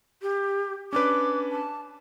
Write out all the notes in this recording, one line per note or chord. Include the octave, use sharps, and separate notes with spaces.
G4
C#4 D4 B4 D6
A5